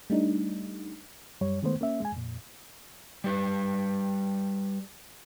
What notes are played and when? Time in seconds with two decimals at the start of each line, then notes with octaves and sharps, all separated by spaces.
0.10 G3 A3 D4 D#4
1.41 F#2 G3 C#5
1.63 D#3 G#3 A3 B3 C5
1.81 A#3 C#4 E5
2.00 G#3 G#5
2.12 F2 A#2
3.24 G3 G4 B4